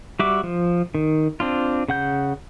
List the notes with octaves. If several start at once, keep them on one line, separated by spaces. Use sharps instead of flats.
G3 F#4 E5 D6
F3
D#3
C4 D4 F4
C#3 F#5 G6